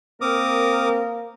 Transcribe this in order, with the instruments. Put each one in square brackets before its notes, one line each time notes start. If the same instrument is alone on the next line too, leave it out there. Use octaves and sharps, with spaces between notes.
[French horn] A#3 [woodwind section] C4 A#4 [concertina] D6 D#6